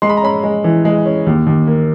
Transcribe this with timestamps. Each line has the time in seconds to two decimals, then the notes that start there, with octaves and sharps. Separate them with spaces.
0.02 G#3 C6
0.10 B5
0.17 A#5
0.23 C#4 B5
0.43 G#3
0.64 E3
0.85 G#3
1.05 C#4
1.26 D#2
1.46 D#2
1.67 A#3